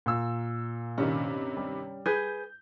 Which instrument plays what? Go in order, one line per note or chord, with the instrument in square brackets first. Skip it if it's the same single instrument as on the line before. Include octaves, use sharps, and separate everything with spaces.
[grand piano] A#2 E6
[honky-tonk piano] G2 C3 D#3 [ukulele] C#4
[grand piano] G3
[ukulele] G#4 B4 [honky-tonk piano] G6